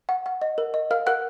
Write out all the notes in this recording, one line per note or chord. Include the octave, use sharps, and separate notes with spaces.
F#5
F#5
D#5
A#4
D#5
A#4 F5 F6
A#4 F#5 F#6